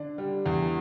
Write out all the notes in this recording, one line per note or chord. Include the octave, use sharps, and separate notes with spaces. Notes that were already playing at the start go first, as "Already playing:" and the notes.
Already playing: D3 D4
G3
E2